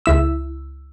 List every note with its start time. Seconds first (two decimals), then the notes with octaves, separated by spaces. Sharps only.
0.06 C#2 E4 E6